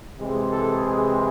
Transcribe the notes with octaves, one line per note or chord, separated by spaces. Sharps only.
C3 E3 G#3 C4
A4
G#4